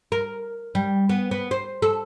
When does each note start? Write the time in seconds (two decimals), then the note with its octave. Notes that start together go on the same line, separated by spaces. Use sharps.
0.12 A#4
0.75 G3
1.09 B3
1.31 B3
1.51 C5
1.82 A4